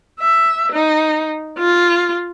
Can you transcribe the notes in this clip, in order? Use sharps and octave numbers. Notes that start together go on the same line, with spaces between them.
E5
D#4
F4